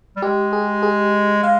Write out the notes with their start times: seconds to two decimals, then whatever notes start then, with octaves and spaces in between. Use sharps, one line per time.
0.16 G3
0.22 G#3 G4
0.53 G#4
0.83 G#4
1.43 G#3 F5